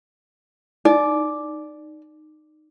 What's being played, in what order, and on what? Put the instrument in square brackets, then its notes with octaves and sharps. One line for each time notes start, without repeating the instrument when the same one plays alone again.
[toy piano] D#4 [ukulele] D5